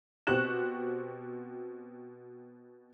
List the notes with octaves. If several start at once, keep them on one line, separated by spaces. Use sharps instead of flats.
B2 C4 F#4 G4 F#6 E7